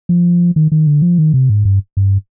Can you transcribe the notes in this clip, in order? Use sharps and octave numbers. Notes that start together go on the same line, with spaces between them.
F3
D#3
D#3
D3
F3
D#3
C3
G#2
G2
G2